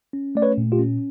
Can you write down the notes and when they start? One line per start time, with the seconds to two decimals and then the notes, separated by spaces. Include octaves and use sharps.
0.13 C#4
0.35 A3 D5
0.42 B4 C#5
0.58 A#2
0.72 F4 G4
0.79 C#4